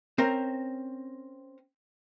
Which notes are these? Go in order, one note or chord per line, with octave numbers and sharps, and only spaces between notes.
C4 C#4 A#4 C5